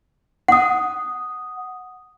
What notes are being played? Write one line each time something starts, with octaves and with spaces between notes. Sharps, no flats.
F#5 D#6